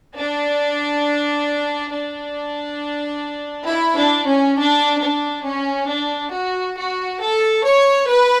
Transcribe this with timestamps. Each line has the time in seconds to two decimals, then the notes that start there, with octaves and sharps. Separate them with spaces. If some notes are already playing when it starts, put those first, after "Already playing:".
0.18 D4
1.93 D4
3.69 E4
3.98 D4
4.27 C#4
4.57 D4
5.01 D4
5.45 C#4
5.88 D4
6.32 F#4
6.77 F#4
7.21 A4
7.64 C#5
8.09 B4